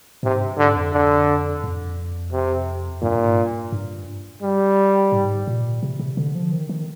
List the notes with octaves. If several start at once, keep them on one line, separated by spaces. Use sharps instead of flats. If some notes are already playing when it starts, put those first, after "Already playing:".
G#2 C3
G2
G#2 D3
F2
D3
F2
C3
G2 A#2
G#2
G2
G2
G3
G#2
A#2
C3
C3
D3
F3
D#3
D#3